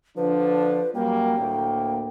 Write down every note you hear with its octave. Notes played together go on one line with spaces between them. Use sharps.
D3 F3 D4 B4
F#2 G3 A#3 G5
D2 A2 A#3